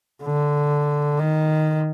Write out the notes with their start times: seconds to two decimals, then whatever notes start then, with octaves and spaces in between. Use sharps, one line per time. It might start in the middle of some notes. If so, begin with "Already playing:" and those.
0.23 D3
1.19 D#3